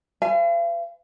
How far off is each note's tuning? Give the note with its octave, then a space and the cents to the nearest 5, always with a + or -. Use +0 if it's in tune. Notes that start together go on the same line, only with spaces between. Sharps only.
B4 +45 F5 -45 G#5 +0